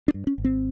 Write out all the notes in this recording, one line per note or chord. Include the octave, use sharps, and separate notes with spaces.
D4
G2
C#4
G#1
C4